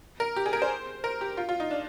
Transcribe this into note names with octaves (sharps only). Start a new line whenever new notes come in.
A#4
G4
G#4
A#4
C5
A#4
G4
F4
F4
D#4
D4